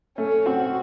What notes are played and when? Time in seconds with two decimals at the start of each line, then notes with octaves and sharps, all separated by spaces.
0.18 A3 C#4
0.46 C4 F#4